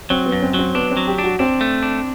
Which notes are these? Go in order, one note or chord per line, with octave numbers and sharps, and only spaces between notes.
F#3 C4
B3
F#2
C4
F#3 C4
B3 D4
C4
F#3
G4
D4
F#4
C4 D4
A3
D4